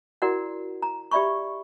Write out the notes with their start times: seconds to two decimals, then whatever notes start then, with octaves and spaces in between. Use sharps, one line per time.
0.22 E4 F#4 A#4 D5 F#5
0.82 A#5
1.11 G4 D5 E5 B5 C#6